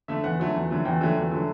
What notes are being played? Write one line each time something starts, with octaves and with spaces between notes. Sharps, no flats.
D3 A3 E5
E2 F#5
D3 F#3 A3
E2
D3 F#3 A3
E2 G5
D3 F#3 A3
E2
D3 F#3 A3